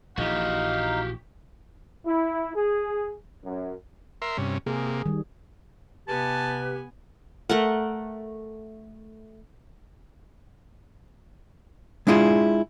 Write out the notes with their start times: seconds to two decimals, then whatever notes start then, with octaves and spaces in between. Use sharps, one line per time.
0.17 A#1 A#2 E3 D#4 F#4 G4 F5
2.05 E4
2.55 G#4
3.44 F#2
4.22 A#4 E5 C6
4.38 G2 C3 C#4
4.66 C3 A#3 G#4
4.87 G#4
5.06 D#3 G3
6.08 C3 B3 G4 B4 G#5 A5
7.49 A3 A#4 F#5
12.07 G#3 D4 E4 F4 G#4